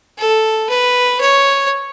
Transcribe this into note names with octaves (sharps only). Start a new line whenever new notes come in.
A4
B4
C#5